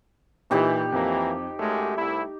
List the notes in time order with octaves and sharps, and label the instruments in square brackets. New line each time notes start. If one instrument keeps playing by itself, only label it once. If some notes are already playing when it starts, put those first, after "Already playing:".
[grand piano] A#2 [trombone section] E3 [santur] D#4 G4 B5
[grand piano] F2 [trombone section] E3 A#3
[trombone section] F#2 G#3 [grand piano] A3
[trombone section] C2 E4